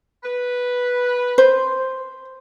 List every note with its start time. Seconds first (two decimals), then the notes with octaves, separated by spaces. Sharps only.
0.24 B4
1.38 C5